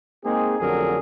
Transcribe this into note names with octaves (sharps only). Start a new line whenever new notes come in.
G#3 A#3 C4 D#4 G#4
A1 F2 D3 F#3 G#4 A#4